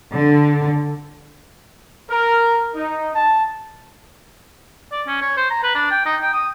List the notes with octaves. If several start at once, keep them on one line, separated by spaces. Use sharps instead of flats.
D3
A#4
D#4
A5
D5
C#4
C#5
C5
A#5
B4
D4
G5
D#4
G5
D#6